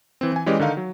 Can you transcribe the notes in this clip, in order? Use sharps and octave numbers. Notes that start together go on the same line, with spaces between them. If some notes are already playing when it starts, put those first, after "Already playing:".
E3 C4
E3 G#5
E3 G#3 C#4 G4 D5 D#5
D3 D#3 D#4 F5
F#3